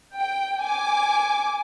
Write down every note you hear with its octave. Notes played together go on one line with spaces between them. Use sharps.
G5
G#5 D6